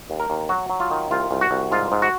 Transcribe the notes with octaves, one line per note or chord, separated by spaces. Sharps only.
D#2
A#4
D#2
F#3 F#4
F#3
F4
D#3
C2 F4
C2
F#4
C2
G#2 F4
G#2
F#4